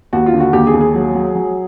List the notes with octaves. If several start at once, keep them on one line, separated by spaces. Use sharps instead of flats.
D#2 F#4
F4
D3
F#4
D#2 G4
G#4
D#2
G#4
F#3
F#3
F#3